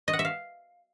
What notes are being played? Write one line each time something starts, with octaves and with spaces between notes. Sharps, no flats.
D#5
F#5
E5
F5